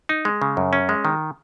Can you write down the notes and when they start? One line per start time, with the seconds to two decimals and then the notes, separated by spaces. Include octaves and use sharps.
0.09 D#4
0.25 G#3
0.42 C#3
0.57 F#2
0.73 C#4
0.89 G#3
1.05 D#3